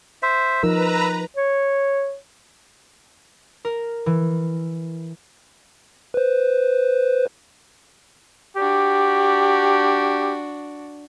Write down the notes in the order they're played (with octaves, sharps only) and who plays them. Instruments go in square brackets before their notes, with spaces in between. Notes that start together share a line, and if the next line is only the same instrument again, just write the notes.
[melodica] C5 E5
[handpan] F3 D#4 A#4 [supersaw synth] B4 A#5 [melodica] E6
[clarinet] C#5
[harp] A#4
E3
[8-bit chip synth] B4 C5
[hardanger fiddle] D4 F#4 [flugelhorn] G4